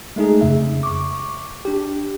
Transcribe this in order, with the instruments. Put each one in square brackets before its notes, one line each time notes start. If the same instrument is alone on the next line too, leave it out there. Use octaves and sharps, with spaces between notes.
[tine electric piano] G#3 A3 D#4 G#4
F2 C#3 E5
C#6 D6
D4 G4